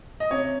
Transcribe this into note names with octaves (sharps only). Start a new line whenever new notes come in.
D#5
C3 C#5